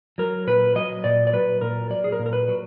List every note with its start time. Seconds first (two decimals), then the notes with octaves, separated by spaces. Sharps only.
0.18 F#3 A#4
0.47 A#2 B4
0.75 F#3 D#5
1.04 A#2 D5
1.27 D5
1.33 F#3 B4
1.61 A#2 A#4
1.90 F#3 D5
2.04 G#4
2.12 A#4
2.19 A#2
2.26 A#4
2.33 B4
2.48 F#3